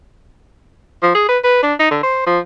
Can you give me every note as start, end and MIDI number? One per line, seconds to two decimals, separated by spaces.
1.03 1.12 53
1.15 1.26 68
1.29 1.38 71
1.44 1.63 71
1.63 1.74 62
1.79 1.88 63
1.91 2.01 50
2.03 2.25 72
2.26 2.39 53